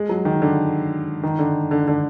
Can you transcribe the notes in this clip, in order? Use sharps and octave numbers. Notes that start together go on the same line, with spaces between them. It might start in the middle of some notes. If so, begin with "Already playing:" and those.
Already playing: G#3
F#3
D#3
D3
D#3
D3
D3
D3